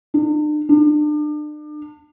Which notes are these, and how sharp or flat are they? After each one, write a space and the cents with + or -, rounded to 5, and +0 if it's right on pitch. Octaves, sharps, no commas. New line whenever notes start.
D4 +45
D4 +35